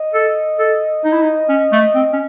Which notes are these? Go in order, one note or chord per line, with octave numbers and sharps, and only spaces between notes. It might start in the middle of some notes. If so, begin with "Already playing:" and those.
Already playing: D#5
A4
A4
D#4
E4
D#4
C#4
A3
C4
C#4